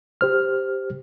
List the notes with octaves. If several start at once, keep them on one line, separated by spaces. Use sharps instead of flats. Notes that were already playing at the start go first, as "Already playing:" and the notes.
G4 C5 F6